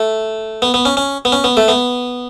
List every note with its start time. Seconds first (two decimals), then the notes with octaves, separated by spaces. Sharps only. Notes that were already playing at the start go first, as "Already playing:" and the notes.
Already playing: A3
0.62 B3
0.74 B3
0.85 C#4
0.97 C#4
1.25 B3
1.32 C#4
1.44 B3
1.57 A3
1.68 B3